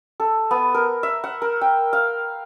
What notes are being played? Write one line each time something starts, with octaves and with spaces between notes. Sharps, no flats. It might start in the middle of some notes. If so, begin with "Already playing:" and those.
A4
B3
A#4
E5
F#5
A#4
G5
F5